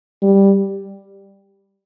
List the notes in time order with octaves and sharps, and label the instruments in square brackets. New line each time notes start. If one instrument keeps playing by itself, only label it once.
[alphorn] G3